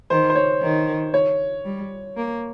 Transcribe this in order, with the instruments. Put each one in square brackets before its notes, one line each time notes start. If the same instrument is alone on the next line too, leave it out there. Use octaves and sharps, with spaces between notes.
[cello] D#3 [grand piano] C5
[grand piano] C5
C#5
[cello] D#3
[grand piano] C#5
[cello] G3
A#3